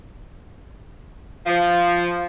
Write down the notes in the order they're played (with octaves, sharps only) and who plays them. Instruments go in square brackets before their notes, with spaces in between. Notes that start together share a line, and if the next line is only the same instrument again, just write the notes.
[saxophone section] F3